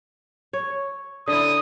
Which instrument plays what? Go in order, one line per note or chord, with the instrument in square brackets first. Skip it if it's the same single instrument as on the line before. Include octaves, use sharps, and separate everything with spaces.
[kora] C#5
[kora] D3 E4 [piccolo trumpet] D#6